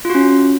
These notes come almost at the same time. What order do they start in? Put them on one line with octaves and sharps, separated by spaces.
F4 F#4 C#4